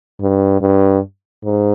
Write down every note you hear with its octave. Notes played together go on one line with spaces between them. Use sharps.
G2
G2
G#2